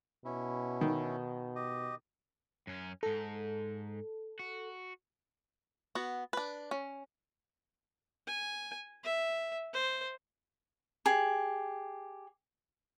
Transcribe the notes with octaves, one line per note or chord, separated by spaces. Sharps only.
B2 C#4 E4
D#3
G4 D#5
F#2 C#4
G#2 D#4 A4
F#4
B3 F#4 F#5
D4 B4
C#4
G#5
E5
C5
G4 G#4